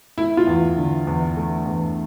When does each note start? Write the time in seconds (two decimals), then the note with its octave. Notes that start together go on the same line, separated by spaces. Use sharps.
0.18 A3 E4
0.37 F4
0.47 E2
0.77 D3
1.07 E2
1.36 A3
1.66 E2